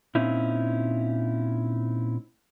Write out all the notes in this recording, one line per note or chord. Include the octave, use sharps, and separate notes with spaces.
A#2 C4 C#4 D#4 E4